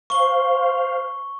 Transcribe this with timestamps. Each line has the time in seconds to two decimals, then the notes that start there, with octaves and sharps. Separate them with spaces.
0.10 C5 F5 C#6 G7